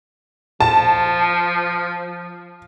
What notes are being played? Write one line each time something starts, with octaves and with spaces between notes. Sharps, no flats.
F3 A5